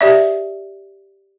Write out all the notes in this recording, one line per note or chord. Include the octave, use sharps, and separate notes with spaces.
G4 D5 E5